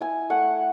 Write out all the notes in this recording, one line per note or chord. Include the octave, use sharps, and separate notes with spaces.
E4 G#5
A3 F#5